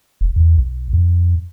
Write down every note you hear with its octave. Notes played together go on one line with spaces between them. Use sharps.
E1
E2
B1
F2